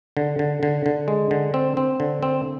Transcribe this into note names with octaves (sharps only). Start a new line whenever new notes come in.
D3
D3
D3
D3
G#3
D3
C4
C4
D3
C4